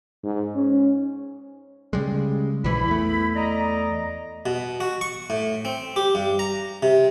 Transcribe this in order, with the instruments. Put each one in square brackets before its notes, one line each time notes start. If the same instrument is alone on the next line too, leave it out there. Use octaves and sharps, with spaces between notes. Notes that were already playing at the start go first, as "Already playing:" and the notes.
[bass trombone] G#2
C#4
[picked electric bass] C#3 G3 G#3
[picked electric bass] A#1 E3 [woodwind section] E4 B5
[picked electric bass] E2 A3
[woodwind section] D5 D#5 A#5
[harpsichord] B2
F#4
C#6
A2
C4
G4
G2
A#5
C3